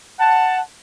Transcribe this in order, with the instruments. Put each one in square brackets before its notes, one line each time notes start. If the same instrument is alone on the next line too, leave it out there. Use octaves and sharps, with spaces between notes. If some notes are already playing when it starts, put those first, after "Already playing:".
[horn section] F#5 A5